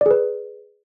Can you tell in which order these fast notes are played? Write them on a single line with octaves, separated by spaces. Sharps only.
D5 G#4 B4